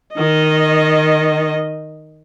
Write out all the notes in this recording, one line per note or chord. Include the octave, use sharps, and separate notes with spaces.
D#3 D#5